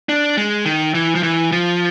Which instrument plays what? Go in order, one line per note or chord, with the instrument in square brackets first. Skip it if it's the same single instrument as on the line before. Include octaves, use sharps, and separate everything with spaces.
[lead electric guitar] D4
G#3
D#3
E3
F3
E3
F3